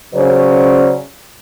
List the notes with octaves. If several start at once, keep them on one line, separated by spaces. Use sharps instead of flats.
C#3 F#3 C#4 C5 D5